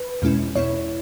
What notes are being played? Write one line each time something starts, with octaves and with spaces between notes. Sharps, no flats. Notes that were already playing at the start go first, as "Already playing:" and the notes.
Already playing: B4
E2 B2 G#3 C#4 E4
E2 B2 B3 E4 C#5